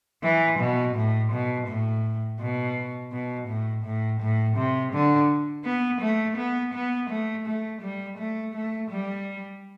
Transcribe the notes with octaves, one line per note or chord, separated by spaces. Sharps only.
E3
B2
A2
B2
A2
B2
B2
A2
A2
A2
C3
D3
B3
A3
B3
B3
A3
A3
G3
A3
A3
G3